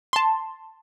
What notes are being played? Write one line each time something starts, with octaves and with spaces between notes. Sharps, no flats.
A5 C6